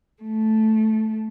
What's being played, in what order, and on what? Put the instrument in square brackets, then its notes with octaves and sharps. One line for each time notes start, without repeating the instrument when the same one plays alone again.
[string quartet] A3